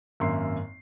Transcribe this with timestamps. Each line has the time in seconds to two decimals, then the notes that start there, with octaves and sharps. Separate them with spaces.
0.20 G#1 F#2 A#3 E5 C6 C7